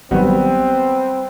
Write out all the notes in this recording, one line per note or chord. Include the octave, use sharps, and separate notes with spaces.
A1 D#3 F#3 G3 B3 C4